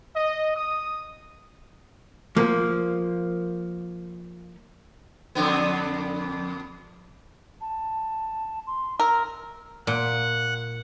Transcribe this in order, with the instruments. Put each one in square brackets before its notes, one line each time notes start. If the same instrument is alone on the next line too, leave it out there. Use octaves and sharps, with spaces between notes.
[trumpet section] D#5
D#6
[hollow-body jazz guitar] F3 A#3
[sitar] F2 D3 B3
[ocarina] A5
C6
[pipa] A#4 [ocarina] E6
[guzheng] A#2 [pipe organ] F#5